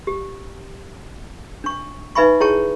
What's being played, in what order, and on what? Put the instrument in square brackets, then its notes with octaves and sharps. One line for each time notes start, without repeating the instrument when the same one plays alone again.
[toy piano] G4
D4 C#6
D#4 B4 E5 G#5 B5 C#6
E4 G#4 C#5 G5 A5 C#6